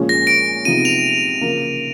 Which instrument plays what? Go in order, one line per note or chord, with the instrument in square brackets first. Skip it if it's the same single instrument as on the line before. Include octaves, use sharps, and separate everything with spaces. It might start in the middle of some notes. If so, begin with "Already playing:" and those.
Already playing: [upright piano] A#2 F3 G#3 C#4
[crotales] A#6
D7
[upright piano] C3 F3 G#3 B3 D#4 [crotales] D#7
[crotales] F7
[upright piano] C#3 F3 A#3